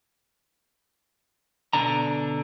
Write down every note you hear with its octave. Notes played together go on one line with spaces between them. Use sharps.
B2 D3 D4 A#5